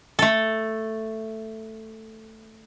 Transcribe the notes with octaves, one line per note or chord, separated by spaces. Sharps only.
A3 A4